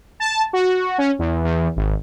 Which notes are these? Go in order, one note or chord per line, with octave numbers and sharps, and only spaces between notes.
A5
F#4
C#4
E2
E2
G#1